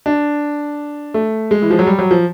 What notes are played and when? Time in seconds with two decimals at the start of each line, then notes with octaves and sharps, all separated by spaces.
0.06 D4
1.14 A3
1.51 G#3
1.62 E3
1.71 F3
1.79 F#3
1.87 G3
1.99 F#3
2.11 F3